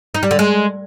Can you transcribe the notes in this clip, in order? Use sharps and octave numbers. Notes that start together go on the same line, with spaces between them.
D#4
G3
D3
G#3